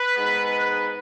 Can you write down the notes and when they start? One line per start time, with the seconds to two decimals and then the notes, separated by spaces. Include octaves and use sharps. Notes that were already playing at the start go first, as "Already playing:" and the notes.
Already playing: B4
0.15 G#2 G#3 B3